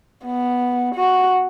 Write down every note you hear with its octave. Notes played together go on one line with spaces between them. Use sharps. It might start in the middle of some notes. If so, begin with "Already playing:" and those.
B3
F#4